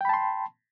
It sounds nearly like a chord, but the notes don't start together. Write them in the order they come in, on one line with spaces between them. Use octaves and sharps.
G5 B5 A5 C6